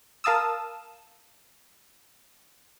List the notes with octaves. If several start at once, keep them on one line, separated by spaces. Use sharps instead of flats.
A#4 F5 A5 D#6 E6